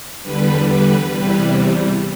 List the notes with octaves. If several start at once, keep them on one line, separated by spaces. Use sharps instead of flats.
E2 D3 G3 B4
B4
E2 C3 E3 G3 B4